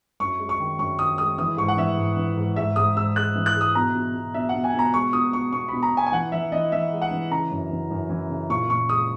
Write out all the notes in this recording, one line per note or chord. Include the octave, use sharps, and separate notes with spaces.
F#2 C#6
G#3
C#6
D#3
F#2 C#6
D#3 D#6
G#3 D#6
E3 D#6
G#2 C#6
F#5
E3 E5
G#2
E3
G#2
G#2 E5
G#2 D#6
G#2 E6
G#3 F#6
E3
F#6
G#3
D#6
B2 A#5
B2
B2
B2 E5
B2 F#5
G#5
B2 A#5
G#3 C#6
B2 D#6
B2 C#6
B2 C#6
B2 B5
A#5
B2 G#5
G#5
E3 F#5
E3 E5
E3 D#5
E3 E5
G#3
F#5
E3
C#3 A#5
F#2
E3
F#2
E3
C#3
A#2 C#6
A#2 C#6
G#3 D#6